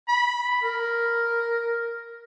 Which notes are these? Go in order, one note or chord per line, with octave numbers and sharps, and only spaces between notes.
B5
A#4